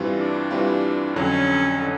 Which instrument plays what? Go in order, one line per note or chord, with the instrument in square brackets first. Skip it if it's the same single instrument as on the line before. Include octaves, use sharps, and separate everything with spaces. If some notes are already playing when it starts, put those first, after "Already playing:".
Already playing: [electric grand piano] G2 E3 G3 C4 F4
[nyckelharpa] D4
[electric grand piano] G2 E3 G3 C4 F4
[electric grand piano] F2 D3 F#3 [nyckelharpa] C#4
[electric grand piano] D3